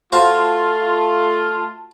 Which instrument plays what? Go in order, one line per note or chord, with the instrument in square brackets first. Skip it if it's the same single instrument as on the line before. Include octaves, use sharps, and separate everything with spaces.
[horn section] A3 F4 [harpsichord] F#4 C5 F5 [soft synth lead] A5